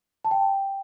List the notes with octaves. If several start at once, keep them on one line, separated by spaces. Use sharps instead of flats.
A5
G5